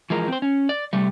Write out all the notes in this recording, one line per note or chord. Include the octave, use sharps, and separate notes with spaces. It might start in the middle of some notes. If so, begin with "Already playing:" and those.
E3 F3 G#3 A#4
C4 C5
C#4
D5
C3 G3 A3